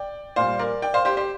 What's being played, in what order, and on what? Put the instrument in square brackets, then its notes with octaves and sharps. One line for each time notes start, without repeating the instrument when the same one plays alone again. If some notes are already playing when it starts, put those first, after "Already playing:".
Already playing: [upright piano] D5 G5
A#2 G3 C5 F5
A#4 D5
D5 G5
C5 F5
G4 C5
G4 C5